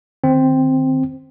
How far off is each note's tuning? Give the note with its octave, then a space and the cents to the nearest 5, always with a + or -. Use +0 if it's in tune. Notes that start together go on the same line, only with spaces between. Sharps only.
D#3 -20 C4 +0